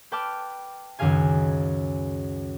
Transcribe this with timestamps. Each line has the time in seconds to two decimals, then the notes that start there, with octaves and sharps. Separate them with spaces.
0.11 B4 G5 A5 D6 F6
0.99 C#2 F#2 D#3 G#4 F5 G#5